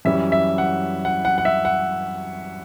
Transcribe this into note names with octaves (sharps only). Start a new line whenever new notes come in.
F#2 E3 G3 C#4 E5
E5
F#5
F#5
F#5
F#5
E5
F#5